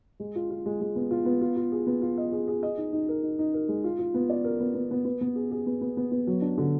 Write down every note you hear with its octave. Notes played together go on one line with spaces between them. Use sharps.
G#3
F4
F4
G#3
G#3
B3
F4
B3
F4
F4
G#4
B3
F4
D#5
G#4
G#4
D#5
D#4
D#4
A#4
D#4
D#4
A#4
G#3
F4
F4
B3
D5
A#4
B3
B3
B3
B3
B3
G#4
G#4
B3
B3
B3
B3
F#3
D4
D3